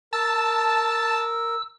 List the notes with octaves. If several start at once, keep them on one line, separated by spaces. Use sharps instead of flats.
A#4 A5 E6